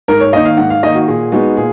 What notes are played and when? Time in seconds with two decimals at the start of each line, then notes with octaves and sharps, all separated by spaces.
0.08 G#2 A#4
0.20 C#5
0.33 D#3 A#3 D#5
0.45 F5
0.57 G#2 F#5
0.70 F5
0.83 D#3 A#3 D#5
0.95 F#4
1.07 A#2 G#4
1.32 G#3 B3 D#4 F#4
1.57 A#2 G#4